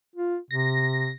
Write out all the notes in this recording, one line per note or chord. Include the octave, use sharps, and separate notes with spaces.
F4
C3 A#6